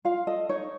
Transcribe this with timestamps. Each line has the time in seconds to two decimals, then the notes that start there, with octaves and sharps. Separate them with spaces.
0.05 F4 F5
0.27 A4 D#5
0.49 D#4 C#5